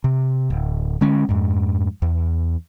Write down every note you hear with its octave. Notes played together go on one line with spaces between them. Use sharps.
C3
D1
D3 G#3 C#4
F2 G#2
E2